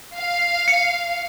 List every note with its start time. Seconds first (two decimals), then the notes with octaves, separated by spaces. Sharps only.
0.17 F5
0.68 C#7